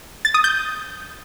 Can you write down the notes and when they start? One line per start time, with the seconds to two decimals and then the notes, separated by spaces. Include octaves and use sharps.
0.25 A6
0.34 D#6
0.44 G6